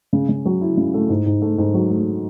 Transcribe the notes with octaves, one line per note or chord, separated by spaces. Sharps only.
C#3
C#3
F#3
E4
C#3
A3
G#2
G#2
A3
G#2
F#3
A3